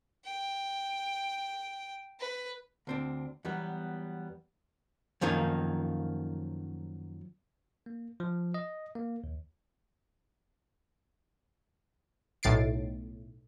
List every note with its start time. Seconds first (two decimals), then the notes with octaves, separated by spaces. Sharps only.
0.25 G5
2.20 B4
2.87 D2 C4 D4
3.45 E2 F#3 G3 B3
5.21 F#2 D#3 F3 A#3 D#4
7.86 A#3
8.20 F3
8.54 D#5
8.95 A#3
9.24 D#2
12.43 B1 A2 A6 C7 D7